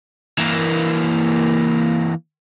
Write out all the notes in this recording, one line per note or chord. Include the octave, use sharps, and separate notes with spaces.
E3 A#3